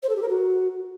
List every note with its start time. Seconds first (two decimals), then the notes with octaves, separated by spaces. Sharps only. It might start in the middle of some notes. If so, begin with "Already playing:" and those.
0.02 C5
0.09 A4
0.15 G4
0.22 A#4
0.28 F#4